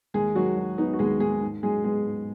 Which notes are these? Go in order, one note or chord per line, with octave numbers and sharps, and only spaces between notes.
D#2 G#3 G#4
D#3 F#3 F#4
F#3
B3 D#4
F#4
D#2 G#3 G#4
D#3 G#3 G#4
G#2
F#3 G#3 G#4
G#3 B3 G#4
G#2